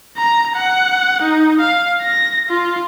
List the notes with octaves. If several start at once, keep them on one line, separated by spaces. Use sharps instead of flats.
A#5
F#5
D#4
F5
A#6
F4